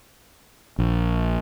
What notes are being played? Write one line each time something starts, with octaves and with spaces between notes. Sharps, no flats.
A#1